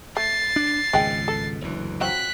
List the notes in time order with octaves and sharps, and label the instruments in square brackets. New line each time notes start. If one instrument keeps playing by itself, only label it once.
[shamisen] A3 [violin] A6 C7
[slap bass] D4
[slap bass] G#1 C#2 B2 [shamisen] G#3 G5
[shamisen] A4
[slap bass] F#1 D2 E3
[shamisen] F3 F#3 C4 [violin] F#6 B6